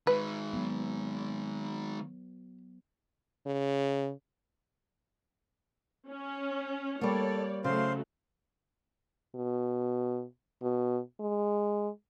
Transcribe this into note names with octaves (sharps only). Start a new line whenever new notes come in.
D#3 G#3 B4
F#3 B3
C#3
C#4
G3 A#3 A4 C#5 D5
C#3 F#3 A3 C5 F5 C6
B2
B2
G#3